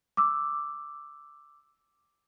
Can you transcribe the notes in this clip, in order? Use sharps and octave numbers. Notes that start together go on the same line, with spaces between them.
D6 E6